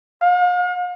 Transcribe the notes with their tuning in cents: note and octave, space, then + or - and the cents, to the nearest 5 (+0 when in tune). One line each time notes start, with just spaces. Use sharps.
F5 +45